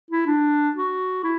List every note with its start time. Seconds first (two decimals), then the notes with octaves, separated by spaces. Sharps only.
0.11 E4
0.26 D4
0.76 F#4
1.24 E4